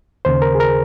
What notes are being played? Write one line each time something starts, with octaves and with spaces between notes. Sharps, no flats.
D#2 C#3 C5
A#4
G#4
A#4